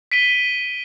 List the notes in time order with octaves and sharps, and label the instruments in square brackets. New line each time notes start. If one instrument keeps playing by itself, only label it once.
[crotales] B6 D7 D#7 G7